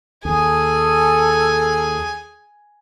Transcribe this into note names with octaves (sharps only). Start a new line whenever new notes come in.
D#2 G#4 A4 G#5